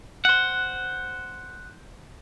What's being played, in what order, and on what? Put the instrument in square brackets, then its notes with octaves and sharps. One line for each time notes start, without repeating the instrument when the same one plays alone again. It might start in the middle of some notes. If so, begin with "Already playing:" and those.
[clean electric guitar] C5 F#5 [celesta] F#6